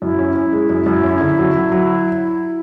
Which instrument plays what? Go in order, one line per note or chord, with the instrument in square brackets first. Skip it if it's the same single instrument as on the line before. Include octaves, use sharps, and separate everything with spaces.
[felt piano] F#2 [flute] E4
[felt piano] C#4
C#4
G#3
F#2
F#2
C#4
D3
F#3
F#3
F#3